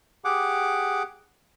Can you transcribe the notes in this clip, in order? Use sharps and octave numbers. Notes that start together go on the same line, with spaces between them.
G4 G#4 F#5 D6